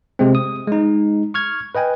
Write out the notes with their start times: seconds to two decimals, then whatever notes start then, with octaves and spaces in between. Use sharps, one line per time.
0.19 C3 G#3 C4
0.35 D#6
0.68 G#3 D#4
1.34 C#6 F6 G#6
1.75 B4 D#5 G5 G#5